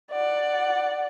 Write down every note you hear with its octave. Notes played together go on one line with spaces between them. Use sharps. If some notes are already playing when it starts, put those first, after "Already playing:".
D5 F#5